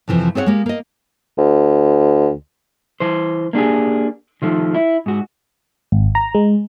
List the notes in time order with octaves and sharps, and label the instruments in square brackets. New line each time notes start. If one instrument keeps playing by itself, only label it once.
[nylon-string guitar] F2 C3 E3 F3
C4 G#4 C#5 E5 F#5
G#3 A#3 G4
A#3 D#5
[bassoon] D2
[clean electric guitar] E3 C5
A#3 D4 G4 G#4
D#3 F3 A3
E4
G#2 F#4
[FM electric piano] G#1
A#5
G#3